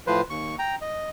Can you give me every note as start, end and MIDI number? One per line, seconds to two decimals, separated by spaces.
0.07 0.21 45
0.07 0.21 53
0.07 0.21 71
0.07 0.21 72
0.30 0.56 39
0.30 0.56 85
0.59 0.75 79
0.59 0.75 82
0.81 1.10 75